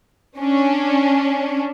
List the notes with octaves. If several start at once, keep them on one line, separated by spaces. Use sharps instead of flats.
C#4 D4